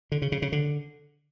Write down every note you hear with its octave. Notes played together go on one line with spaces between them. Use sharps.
D3
C#3
C#3
C#3
D3